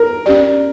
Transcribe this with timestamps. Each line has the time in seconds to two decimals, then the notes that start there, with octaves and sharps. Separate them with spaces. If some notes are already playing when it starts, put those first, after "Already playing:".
Already playing: A#4
0.26 C#4 G4 D5